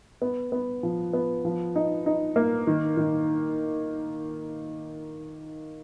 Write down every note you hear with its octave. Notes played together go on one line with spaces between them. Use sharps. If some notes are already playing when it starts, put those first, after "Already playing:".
B3
B3
F3
B3
F3
D#4
D#4
A#3
D#3
D#3